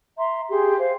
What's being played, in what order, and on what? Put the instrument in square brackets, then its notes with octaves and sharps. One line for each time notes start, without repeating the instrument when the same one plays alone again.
[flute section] E5 A#5 C6
G4 G#4 C6
C5 F5